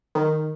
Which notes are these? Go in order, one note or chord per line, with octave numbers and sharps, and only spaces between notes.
D#3